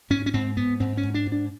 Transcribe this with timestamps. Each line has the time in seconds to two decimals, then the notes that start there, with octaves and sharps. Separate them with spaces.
0.10 G#2 C#4
0.26 C#4
0.34 G#2 C4
0.57 G#2 B3
0.80 G#2 C4
0.97 C#4
1.03 G#2
1.14 D4
1.26 G#2
1.32 D4